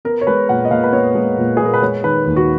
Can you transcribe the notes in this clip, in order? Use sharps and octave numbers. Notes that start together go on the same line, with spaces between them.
B3 A#4
C#5
G#3 B4
A#2 F#5
D#5
A#2 F5
B4
B3 C#5
G#3
A#2
A#2 G#4
A#4
B4
G#3 C#5
D#3 B4
D#2
F#4